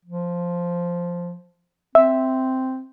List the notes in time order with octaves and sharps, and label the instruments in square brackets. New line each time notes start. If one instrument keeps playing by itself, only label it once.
[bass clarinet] F3
[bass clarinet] C4 [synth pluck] E5